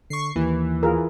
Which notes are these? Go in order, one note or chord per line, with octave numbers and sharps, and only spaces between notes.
D3 C#6 C7
D#2 E3
F4 G#4 A#4